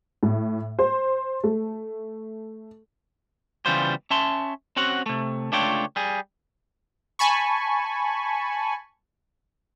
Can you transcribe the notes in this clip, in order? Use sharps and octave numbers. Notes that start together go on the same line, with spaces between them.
A2
C5
A3
C#3 E3 G3 B3 F4 C5
C#4 E5 A5 C6
C4 C#4 F#4 F#5
C3 A3
C#2 A3 D4 F4 C#5 G5
G3 G#4
G#5 A5 B5 C#6